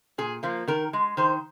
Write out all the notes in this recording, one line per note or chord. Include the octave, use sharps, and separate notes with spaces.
A#2 G#4
F3 A#3
D#3 A#4
G#3
D#3 C5